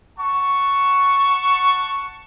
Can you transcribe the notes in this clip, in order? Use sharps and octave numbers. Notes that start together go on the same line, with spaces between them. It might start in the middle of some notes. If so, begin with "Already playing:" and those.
F#5 A5 C#6